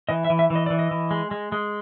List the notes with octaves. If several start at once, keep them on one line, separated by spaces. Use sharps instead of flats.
E3 D#5
E5
E3
E5
E3
D#5
E3 D5
D#5
E3
G#3
G#3
G#3